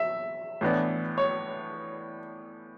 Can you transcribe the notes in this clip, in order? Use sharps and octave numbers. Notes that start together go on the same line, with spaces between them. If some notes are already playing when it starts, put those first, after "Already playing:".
Already playing: E5
A2 E3 B3 D4
C#5